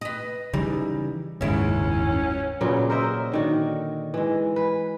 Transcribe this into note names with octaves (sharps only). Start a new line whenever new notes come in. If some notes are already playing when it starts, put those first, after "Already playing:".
B4 D#5
C#3 E3 G3 D#4
F#1 D#2 G#2 C#3 C#4 E4
A#2 C#3 F#3 B3
A#4 C5 D#5 E5
D3 D#3 F#4
E3 G#3
B4